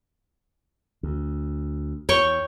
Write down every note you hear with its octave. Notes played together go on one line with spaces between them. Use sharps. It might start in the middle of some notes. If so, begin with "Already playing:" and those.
D2
E2 C#5 G5 C#6